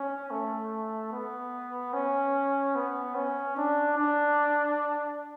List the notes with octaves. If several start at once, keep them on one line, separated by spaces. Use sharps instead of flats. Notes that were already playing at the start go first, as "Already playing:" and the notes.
Already playing: C#4
A3
B3
C#4
B3
C#4
D4
D4